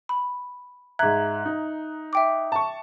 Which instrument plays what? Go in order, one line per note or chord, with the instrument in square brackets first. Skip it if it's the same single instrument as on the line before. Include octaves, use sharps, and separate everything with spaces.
[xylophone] B5
[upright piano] G#2 F#6 [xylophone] E5 A#5 G#6
[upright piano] D#4
[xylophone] E5 G5 D6
[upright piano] A5 C#6